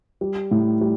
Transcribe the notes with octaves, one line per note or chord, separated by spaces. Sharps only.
G3
A2
G3